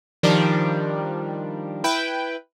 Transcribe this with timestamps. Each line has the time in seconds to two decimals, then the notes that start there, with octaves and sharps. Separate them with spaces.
0.23 D#3 F3 G3 D4 G4 A#4
1.84 E4 B4 G5